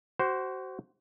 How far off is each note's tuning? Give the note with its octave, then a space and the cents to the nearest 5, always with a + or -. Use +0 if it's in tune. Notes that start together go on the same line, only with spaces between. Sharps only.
F#4 +25 C5 +0